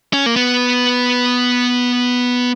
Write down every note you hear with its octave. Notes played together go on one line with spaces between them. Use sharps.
C#4
A#3
B3